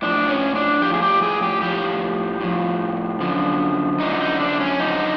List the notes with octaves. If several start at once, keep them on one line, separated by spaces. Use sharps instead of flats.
A2 F3 D4
C#4
D4
A2 F3 G4
G#4
G4
G#4
G4
A2 F3 G4
A2 F3
F#2 D3 F3
F#2 D3 F3 D#4
D#4
D4
C#4
F#2 D3 F3 D#4